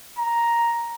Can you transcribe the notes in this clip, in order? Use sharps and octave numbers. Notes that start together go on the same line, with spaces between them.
A#5